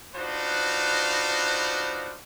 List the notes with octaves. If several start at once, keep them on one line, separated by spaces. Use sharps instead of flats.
D4 D#4 F4 F#4 B4 C5